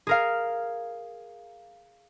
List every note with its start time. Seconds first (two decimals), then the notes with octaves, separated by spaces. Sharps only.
0.07 G#4 A#4 F5